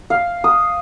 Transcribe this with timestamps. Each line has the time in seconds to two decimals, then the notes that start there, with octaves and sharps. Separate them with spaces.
0.10 F5
0.44 D#6